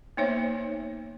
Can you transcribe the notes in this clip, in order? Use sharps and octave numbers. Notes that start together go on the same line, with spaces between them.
A#3 B3 D#4 C5 C#5 E5